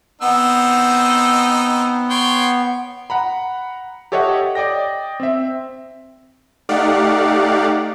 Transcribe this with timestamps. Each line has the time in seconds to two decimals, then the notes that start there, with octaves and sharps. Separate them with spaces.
0.21 B3 C4 D#4 E6
2.10 C#5 G5 C6
3.10 F#5 A#5 B5
4.12 G4 A4 C#5 D#5 E5 F#5
4.55 D5 D#5 G5 A#6
5.20 C4 E5
6.69 A3 D#4 G4 D5 F5 F#5